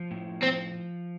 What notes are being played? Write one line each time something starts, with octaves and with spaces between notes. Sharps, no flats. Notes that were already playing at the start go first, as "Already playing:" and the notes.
Already playing: F3
A2
F3 C4